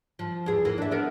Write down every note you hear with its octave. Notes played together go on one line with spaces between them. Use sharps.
F3
E2 G#4
E3 A#3
D4 E5
B3 D4 A#4